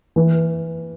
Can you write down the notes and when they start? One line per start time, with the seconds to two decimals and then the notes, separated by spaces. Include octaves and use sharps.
0.16 E3